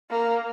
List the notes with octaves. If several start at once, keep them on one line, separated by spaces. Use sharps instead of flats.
A#3